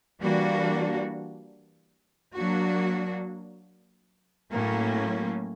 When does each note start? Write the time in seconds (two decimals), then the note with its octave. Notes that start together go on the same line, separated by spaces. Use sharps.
0.21 E3 G3 A#3 D4 F#4
2.36 F#3 A#3 D4 F#4
4.52 A2 F#3 A#3 C#4